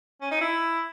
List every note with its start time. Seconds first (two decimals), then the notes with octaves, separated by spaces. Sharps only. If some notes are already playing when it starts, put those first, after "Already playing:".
0.21 C#4
0.31 D#4
0.41 E4